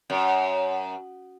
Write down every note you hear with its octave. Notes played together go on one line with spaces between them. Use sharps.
F#2